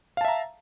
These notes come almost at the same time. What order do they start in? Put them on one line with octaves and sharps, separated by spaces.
F5 A5 E5 A#5